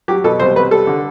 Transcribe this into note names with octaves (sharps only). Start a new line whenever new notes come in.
F#3 G4
B2 A4
C2 C5
C2 B4
G3 A4
D3